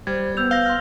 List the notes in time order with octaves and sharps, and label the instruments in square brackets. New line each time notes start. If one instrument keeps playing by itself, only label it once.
[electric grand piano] G3 [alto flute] C5 [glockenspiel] G#6
[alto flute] B3 [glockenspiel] E6 G6 F7
[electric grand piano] F5 [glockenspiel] A#6 G7
[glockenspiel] C6 F6